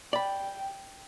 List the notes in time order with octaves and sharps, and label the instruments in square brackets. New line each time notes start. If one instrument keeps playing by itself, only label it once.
[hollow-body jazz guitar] D5 B5 [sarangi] G5